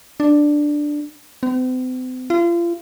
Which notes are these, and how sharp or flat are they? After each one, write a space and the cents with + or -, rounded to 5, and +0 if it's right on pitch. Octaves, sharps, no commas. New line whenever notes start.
D4 +5
C4 -45
F4 -35